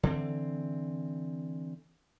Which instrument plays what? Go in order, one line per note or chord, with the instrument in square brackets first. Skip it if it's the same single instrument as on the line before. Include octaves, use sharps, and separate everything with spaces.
[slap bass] D3 E3 C4